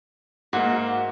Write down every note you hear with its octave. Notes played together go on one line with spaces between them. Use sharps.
G#2 A#3 F#4 E5